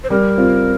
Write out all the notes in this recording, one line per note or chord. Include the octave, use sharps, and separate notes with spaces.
C5
G3 A#4
C4 F4